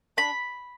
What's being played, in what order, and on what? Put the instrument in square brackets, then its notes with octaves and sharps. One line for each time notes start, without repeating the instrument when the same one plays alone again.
[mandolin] D4 B5